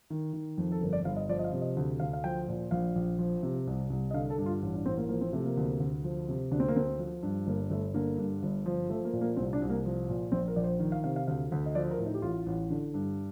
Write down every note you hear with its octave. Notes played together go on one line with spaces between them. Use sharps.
D#3
D#3
F2
A4
G1 A#4
D5
G1 F5
D#5
F3 D5
D#5
F5
C3
D#5
D2
D2 F5
F5
F3 G5
A#2
A#1 F5
A#1
F3
C3
C2
C2
D#5
D3 F5
A4
G2
F4
A1
D4
A1 C4
A#3
F3 A#3
C4
C3 A3
A#3
D2
D2
F3
C3
D2 D4
C4
A#3
D2 C4
F3
G2
G1 A#3
G1 A3
D3 A#3
G2
G1
F3
F3 A3
A#3
A#2
A#3
C2 C4
D4
C2
A#3
F3
A#2
A#1 C4
A#4
A#1 D5
C5
D#3
F5
C3 F5
F5
D2 F5
D2
D#5
F3 D5
A#4
A2
D#4
G4
A1 F4
A1
D3
G2